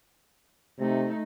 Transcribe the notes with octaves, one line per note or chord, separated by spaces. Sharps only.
C3 A3 D#4